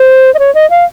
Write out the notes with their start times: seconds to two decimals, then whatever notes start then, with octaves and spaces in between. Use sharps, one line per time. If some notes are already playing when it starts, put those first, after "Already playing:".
Already playing: C5
0.34 D#5
0.39 C#5
0.55 D#5
0.70 F5